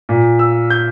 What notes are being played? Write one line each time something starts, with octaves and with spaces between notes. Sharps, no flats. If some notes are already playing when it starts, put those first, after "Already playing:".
A#2
E6
G6